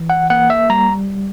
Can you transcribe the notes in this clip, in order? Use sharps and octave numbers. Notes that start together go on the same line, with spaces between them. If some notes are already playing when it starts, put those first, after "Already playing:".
Already playing: E3
F#5
A#3 F#5
E5
G3 A#5